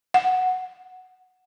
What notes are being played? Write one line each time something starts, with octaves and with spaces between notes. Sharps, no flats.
F#5